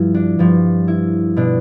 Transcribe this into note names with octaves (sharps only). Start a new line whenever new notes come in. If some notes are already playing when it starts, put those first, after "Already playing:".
Already playing: G2 F3 E4
D4
G2 F3
E4
B2 D4